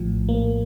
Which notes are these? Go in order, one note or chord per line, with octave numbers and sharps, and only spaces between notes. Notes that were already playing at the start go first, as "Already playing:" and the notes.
Already playing: A#1 A2 F3
A#3